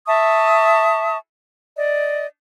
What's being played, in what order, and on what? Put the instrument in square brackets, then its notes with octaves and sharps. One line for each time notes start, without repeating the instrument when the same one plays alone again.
[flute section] E5 A5 C#6 D#6
D5 D#5